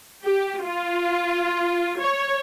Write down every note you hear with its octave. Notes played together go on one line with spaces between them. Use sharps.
G4
F4
C#5